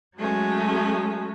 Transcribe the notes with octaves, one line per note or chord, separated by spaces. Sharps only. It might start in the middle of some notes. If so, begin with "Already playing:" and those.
F#3 G#3 A3 C#4